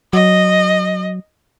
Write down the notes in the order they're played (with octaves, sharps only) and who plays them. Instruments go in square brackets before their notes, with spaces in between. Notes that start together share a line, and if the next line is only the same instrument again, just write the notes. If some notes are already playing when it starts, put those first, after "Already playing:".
[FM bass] F#3 [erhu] D#5